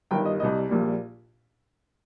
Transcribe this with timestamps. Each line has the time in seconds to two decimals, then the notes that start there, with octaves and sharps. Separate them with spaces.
0.11 G1 G2 D#3 G5
0.25 D#5
0.40 C2 C3 G3 D#5
0.69 A#1 A#2 G3